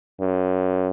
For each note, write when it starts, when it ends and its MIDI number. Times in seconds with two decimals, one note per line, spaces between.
0.21 0.90 42